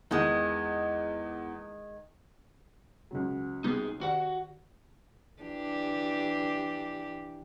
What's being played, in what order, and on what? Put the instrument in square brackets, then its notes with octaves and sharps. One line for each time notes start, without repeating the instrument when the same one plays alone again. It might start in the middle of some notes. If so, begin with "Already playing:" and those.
[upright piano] E2 [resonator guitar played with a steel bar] D#3 G#3
[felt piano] C#2 C#3 F#3
[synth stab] C3 G3 B3 [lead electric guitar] D#4 G#4
[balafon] D#3 G4 D5 [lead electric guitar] F#4 F#5
[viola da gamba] E3 D4 G4